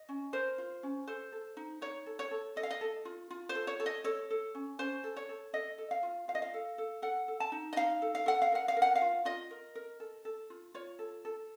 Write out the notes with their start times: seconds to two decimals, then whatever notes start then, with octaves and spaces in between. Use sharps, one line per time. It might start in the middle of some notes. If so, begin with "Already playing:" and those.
Already playing: D#5
0.09 C#4
0.33 A#4 C5
0.58 F4
0.83 C#4
1.07 A4 C5
1.32 A4
1.57 D#4
1.81 D#4 C#5
2.06 A4
2.19 C#5
2.31 A4
2.56 A4 D#5
2.63 F5
2.71 D#5
2.81 A4
3.05 F4
3.30 F4
3.49 C5
3.55 A4
3.67 C#5
3.80 A4
3.86 D#5
4.04 A4 C#5
4.30 A4
4.55 C#4
4.79 C#4 C5
5.04 A4
5.17 C#5
5.29 A4
5.53 A4 D#5
5.78 A4
5.91 F5
6.03 F4
6.28 F4 F5
6.35 D#5
6.42 F5
6.54 A4
6.78 A4
7.02 A4 F#5
7.28 A4
7.40 A5
7.52 D#4
7.73 D#5
7.76 D#4 F5
8.02 A4
8.15 F5
8.26 A4 F#5
8.42 F5
8.52 A#4 F#5
8.68 F5
8.76 A#4
8.82 F#5
8.95 F5
9.02 F4
9.25 F4 D#5
9.51 A#4
9.75 A#4
10.00 A4
10.25 A4
10.50 F4
10.74 F4 C#5
10.99 A4
11.25 A4